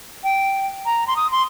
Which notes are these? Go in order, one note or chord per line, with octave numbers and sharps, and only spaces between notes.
G5
A#5
C6
D#6
C6